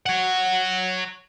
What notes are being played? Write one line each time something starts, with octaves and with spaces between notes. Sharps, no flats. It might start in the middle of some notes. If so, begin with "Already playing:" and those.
C#5 F#5